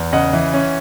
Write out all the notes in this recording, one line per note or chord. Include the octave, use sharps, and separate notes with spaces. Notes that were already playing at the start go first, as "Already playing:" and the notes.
Already playing: E2
C#3 D#5 F#5
E3
C#4